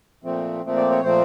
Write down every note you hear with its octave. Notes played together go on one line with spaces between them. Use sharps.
A#2 F3 A3 C4
A#2 F3 A3 C4
D5
C#5
A#2 F3 A3 C4 C5